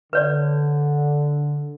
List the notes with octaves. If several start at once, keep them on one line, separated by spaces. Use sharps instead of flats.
D3 B4 C#5 D5